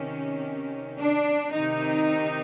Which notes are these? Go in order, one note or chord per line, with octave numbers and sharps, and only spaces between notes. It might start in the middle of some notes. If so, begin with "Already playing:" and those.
Already playing: C3 D#3 C#4
D4
C3 D#3 D#4